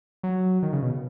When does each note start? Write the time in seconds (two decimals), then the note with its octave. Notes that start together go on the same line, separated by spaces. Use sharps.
0.23 F#3
0.63 D#3
0.73 C#3
0.82 B2